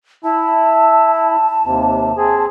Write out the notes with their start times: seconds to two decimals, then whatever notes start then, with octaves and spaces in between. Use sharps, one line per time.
0.24 E4 A5
1.65 D#2 C3
2.17 C4 G#4